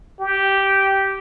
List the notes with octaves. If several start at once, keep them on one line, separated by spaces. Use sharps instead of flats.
G4